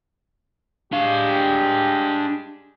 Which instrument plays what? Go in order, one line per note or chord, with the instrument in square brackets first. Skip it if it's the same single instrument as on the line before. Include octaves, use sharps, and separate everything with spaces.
[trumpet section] G3 G#3 G4 [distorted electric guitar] D4 F5